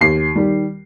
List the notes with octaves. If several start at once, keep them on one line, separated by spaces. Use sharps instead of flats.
D#2 C7
D#3 G3